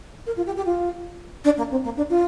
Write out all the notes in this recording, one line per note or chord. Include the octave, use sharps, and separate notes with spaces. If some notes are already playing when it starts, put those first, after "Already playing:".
A#4
F4
G4
G4
F4
D4
A#3
C4
A#3
D4
F4